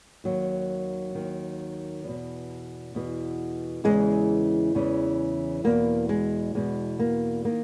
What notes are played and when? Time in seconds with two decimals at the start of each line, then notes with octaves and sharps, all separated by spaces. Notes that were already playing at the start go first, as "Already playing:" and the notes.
0.24 D#2 D#3 F#3
1.15 D#2 D#3
2.04 E2 B2
2.95 E2 B2
3.84 E2 C#3 E3 G#3
4.75 E2 C#3 E3
5.64 E2 B2 A#3
6.09 G#3
6.55 E2 B2 G#3
6.99 A#3
7.45 D#3 A#3